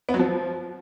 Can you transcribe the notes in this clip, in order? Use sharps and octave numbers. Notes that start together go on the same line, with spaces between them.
B3
F#3
F3